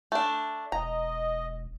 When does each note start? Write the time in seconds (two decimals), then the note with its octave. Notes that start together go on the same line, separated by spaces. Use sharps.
0.12 A3 D4
0.72 E1 D#5 A#5